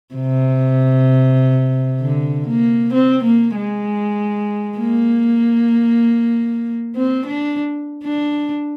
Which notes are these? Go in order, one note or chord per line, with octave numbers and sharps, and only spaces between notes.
C3
D3
A#3
C4
A#3
G#3
A#3
C4
D4
D4